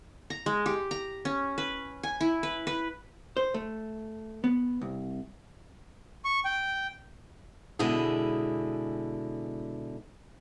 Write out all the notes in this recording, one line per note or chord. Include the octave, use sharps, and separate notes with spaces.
A#5
G#3
G4
A#5
C#4
B4
G#5
E4
B4
B4
C5
A3
B3
C2
C#6
G5
B2 D3 G#3 E4 G#4